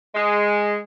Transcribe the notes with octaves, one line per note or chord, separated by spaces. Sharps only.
G#3